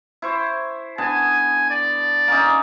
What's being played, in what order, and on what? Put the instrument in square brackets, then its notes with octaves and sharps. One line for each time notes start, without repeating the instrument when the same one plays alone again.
[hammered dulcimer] E4 C5 C#6
[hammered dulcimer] D3 B3 A5 [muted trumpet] G#5
[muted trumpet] D5
[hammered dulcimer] A#3 C#4 D#4